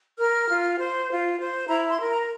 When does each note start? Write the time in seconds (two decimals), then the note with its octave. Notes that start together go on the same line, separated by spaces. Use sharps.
0.19 A#4 F6
0.49 F4
0.78 C5
1.09 F4
1.39 C5
1.69 E4 A#5
1.89 C6
1.99 A#4
2.09 A#5